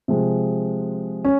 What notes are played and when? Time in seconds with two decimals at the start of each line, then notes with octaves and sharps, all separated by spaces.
0.08 C3 F3 G#3
1.25 C#4